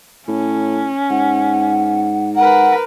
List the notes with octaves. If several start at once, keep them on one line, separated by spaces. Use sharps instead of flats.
A2 C#4
G#2 F#5
A#4 B4 F#5